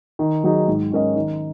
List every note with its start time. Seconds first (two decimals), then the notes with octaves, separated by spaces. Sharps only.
0.19 D#3
0.44 F#3 D#4 G#4
0.68 G#2
0.91 G#3 C#4 A#4 D#5
1.16 D#3